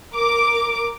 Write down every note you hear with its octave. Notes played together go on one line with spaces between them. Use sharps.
A#4 D6